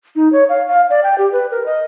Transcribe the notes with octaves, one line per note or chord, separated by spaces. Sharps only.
D#4
C#5
F5
F5
D5
G5
G4
B4
A#4
D#5